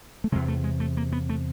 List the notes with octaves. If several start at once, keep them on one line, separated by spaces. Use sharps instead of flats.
A3
E2 C3 G#3
A3
G#3
A3
A#3
B3
A3